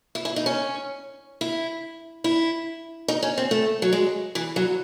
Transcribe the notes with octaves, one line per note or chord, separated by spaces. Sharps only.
E4
E4
D#4
C#4
E4
E4
D#4
C#4
C4
A3
F#3
G#3
E3
F#3